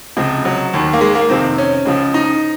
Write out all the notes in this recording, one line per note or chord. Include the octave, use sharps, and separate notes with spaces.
C#2 C3 F3
F#3
D#2 D#3
A#3
G#3
A#3
F2 C3 D#3 C4
C#4
C#2 C#3 F3
D#4